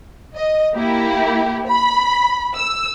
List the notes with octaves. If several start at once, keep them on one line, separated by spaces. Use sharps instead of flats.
D#5
A#3 E4 G4
B5
E6